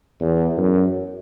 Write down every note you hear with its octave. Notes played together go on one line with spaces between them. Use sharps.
E2
F#2